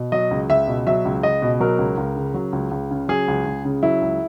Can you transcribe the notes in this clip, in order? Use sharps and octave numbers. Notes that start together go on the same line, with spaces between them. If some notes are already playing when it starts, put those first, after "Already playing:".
Already playing: B2
F#3 D#5
C#2
C#2 E5
B2
F#3 E5
C#2
C#2 D#5
B2
F#3 A#4
C#2
C#2
C#3
F#3
C#2
C#2
C#3
F#3 G#4
C#2
C#2
C#3
F#3 E4
C#2